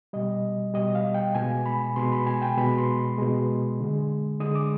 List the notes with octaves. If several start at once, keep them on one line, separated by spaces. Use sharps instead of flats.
B2 G3 D#5
B2 G3 D#5
F5
G5
B2 G#3 G#5
B5
B2 G#3 C6
B5
G#5
G5
B2 G#3 B5
C6
B2 G#3
D3 G#3
D3 G#3 D#6
D6